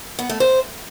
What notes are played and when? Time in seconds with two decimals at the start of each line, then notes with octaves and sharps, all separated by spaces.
0.19 B3
0.29 A3
0.40 C5